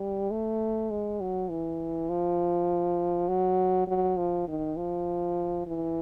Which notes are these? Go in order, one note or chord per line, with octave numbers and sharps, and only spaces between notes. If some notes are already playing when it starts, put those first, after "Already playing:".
Already playing: G3
A3
G#3
F#3
E3
F3
F#3
F#3
F3
D#3
F3
E3